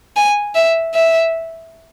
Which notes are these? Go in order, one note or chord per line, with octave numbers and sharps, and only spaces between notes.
G#5
E5
E5